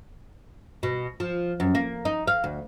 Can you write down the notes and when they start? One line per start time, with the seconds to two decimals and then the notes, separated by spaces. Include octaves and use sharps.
0.83 B2
1.20 F3
1.60 F#2
1.75 A#3
2.05 D#4
2.27 F5
2.44 D2